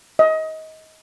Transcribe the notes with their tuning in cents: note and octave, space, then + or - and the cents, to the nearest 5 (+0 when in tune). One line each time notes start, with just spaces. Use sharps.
D#5 +25